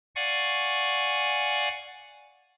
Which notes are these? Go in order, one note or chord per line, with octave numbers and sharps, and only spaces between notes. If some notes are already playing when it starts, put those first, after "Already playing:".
D5 F5 F#5 G#5 C#6